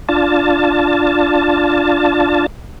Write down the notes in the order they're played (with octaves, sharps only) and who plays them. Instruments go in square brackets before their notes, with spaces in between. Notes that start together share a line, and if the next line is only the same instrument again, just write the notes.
[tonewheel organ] D4 F4 A5